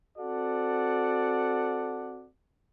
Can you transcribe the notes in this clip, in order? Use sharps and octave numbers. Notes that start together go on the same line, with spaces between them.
C4 F#4 A4 D5 F#5